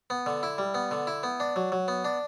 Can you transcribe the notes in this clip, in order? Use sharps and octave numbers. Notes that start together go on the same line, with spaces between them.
B3
D3
E4
G3
B3
D3
E4
B3
D4
F#3
F#3
B3
D4